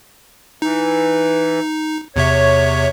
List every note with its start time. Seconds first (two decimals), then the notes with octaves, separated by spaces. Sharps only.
0.62 E3 D#4
2.16 E2 C3 C#5 E5